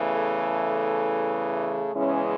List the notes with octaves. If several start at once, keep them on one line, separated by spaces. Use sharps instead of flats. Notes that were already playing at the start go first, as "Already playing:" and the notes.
Already playing: E2 C#3 E3 A3
A4
G#4
E2 C#3 E3 G#3 C#4